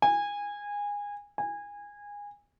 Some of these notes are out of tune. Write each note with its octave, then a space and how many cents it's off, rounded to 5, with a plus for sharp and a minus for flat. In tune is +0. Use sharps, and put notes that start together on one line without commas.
G#5 -20
G#5 -20